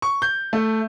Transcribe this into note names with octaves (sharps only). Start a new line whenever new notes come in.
C#6
G6
A3